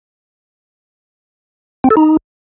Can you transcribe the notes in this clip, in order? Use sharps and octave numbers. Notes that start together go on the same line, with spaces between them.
C4
A4
D#4